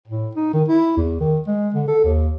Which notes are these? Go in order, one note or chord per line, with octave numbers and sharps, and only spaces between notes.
A2
D#4
D#3
E4
E2
D#3
G#3
D3
A4
D#2